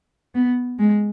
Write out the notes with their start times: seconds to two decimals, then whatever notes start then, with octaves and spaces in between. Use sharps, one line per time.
0.35 B3
0.79 G#3